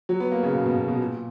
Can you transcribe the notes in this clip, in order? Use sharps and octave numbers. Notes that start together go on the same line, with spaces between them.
F#3
B3
A#3
C#3
B2
B2
B2
B2
A#2